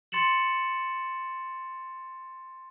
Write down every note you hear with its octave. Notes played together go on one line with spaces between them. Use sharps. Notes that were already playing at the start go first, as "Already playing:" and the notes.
C6 A6 C#7 E7 F#7